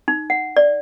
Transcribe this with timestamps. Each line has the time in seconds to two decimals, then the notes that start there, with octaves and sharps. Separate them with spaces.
0.08 D#4
0.30 F#5
0.57 D5